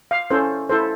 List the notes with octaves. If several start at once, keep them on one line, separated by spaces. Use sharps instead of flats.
F5
C#4 E4 A4 C5
E4 A4 C5